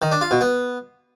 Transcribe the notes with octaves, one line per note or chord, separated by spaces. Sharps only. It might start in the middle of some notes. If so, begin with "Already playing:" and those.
D#3
D4
F4
B2
B3